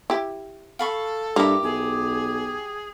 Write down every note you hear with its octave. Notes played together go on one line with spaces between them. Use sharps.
E4 G4
A4 F5 B5 C#6
G2 A#3 E4 G4 A#5 D6
B1 G#4